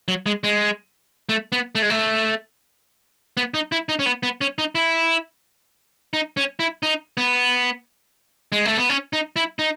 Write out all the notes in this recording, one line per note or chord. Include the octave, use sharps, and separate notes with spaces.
F#3
G#3
G#3
A3
B3
A3
G#3
A3
B3
D#4
E4
D#4
C#4
B3
B3
C#4
D#4
E4
D#4
C#4
E4
D#4
B3
G#3
A3
B3
C#4
D#4
E4
D#4